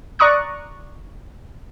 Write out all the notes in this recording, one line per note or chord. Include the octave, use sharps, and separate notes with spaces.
D5 A#5 C#6 D#6 F#6